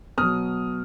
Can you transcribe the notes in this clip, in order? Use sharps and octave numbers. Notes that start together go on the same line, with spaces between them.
B2 F#3 D#6 F6